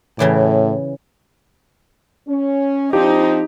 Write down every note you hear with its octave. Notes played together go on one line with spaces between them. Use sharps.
A2 C#3 E3 D5
C#4
F3 C4 D4 D#4 G4